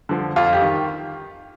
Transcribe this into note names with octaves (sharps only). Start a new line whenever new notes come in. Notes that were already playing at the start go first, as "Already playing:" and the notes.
D3 F3
F2 F4
G4
D#3